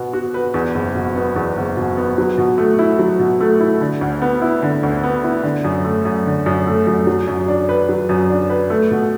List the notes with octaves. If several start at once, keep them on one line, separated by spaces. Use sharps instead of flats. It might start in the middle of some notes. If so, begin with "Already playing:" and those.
Already playing: B2 B3
F#4
B4
E2
F#1
B2
B3
E2
F#1
B2
B3
F#3
B2
A3
E4
F#3
B2
A3
E4
D3
D2
B3
E4
D3
D2
B3
E4
D3
F#2
A3
F#2
D3
F#2
A3
F#2
F#3
F#2
D4
B4
F#3
F#2
D4
B4
A3
B2